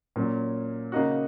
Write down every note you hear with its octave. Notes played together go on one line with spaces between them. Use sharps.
A#2 F#3 C#4
C#3 A#3 D#4 F#4